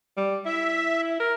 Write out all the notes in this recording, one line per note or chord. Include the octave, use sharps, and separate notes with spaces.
G3
E4 E5
A#4